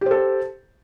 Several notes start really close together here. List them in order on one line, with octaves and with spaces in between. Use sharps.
G4 C5 A4